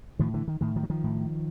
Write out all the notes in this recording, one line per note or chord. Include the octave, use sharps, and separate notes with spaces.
A2 D#3 F3
D3 E3
D#3
A2 D#3
D#3 F3
F#3
D#3 F3
A2